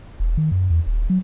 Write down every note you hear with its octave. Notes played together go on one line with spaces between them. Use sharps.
E1
D#3
F#2
E2
D#1
F#3